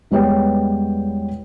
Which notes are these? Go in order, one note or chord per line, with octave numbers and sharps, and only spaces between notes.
E2 G3 G#3 B3 C#5 G5